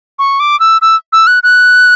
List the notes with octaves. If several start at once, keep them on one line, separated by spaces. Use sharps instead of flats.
C#6
D6
E6
E6
E6
F#6
F#6